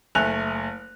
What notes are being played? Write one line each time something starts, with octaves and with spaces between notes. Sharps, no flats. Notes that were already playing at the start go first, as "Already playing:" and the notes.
F#1 A3 G#5 F#6 F7